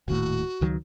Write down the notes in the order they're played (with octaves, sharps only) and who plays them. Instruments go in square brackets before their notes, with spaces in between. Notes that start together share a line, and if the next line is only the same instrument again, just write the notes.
[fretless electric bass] D#1 D#2 A2 [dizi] F#4
[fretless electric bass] C#2 D#3 F#3